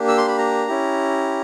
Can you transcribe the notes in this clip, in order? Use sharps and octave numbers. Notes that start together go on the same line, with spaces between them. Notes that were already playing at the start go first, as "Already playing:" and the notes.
Already playing: A#3 D4 G4
E6
C6
B5
A#5
C#4 E4 G4